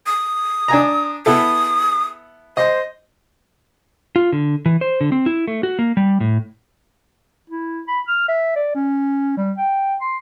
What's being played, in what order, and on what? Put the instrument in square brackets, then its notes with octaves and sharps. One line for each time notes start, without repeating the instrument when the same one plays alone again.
[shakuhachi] D#6
[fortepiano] D4 G#5 A#5
[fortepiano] B3 E4 A4 [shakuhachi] D#6
[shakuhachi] C5 [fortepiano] D#5
[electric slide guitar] F4
D3
E3
C5
D3
C4
E4
A3
F#4
A#3
G3
A2
[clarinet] E4
B5
F6
E5
D5
C#4
G3
G5
C6